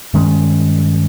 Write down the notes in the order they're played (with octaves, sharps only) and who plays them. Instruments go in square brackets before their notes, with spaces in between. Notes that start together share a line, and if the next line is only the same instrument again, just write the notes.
[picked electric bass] G2 D#3 G#3 C#4